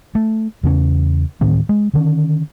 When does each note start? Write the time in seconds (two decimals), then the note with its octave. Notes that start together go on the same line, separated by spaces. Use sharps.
0.15 A3
0.63 E2 C#3 C4 C#4
1.41 D2 A2 D#3 C4
1.69 G#3
1.94 D3 D#3 C#4